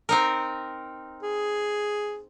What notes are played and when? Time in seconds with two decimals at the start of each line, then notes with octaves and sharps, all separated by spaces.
0.09 C4 D#4 A#4
1.23 G#4